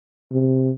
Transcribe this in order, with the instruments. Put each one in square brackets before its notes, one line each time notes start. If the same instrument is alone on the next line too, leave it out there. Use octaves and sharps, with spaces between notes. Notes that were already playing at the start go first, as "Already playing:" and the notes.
[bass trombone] C3